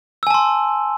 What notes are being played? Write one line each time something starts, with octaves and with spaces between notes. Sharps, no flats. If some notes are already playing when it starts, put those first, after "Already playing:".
G#5 A5 C6 E6